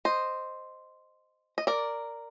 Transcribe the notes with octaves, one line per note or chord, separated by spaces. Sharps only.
C5 D#5
D#5
A#4 D5